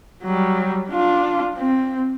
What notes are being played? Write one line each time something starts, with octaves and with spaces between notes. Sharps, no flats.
F#3 G3
D4 F4
C4